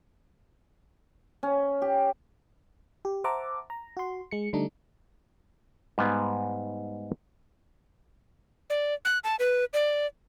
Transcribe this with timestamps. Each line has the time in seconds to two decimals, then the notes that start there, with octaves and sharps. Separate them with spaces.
1.43 C#4
1.82 G4
3.05 G4
3.24 C5 E5 F#5 A5 A#5 D6
3.70 A#5
3.97 F#4 C6
4.31 G#3 C#7
4.53 D3 G3 A3 D4 D#4
5.98 G#2 G3 B3 F5 G#5
8.70 D5
9.05 F#6
9.24 A5
9.39 B4
9.73 D5